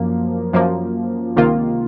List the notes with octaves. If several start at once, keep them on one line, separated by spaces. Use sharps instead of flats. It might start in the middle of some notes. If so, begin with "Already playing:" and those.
Already playing: F#2 F3 A#3
F#2 F3 A#3
C#2 C3 D#3 A#3 F4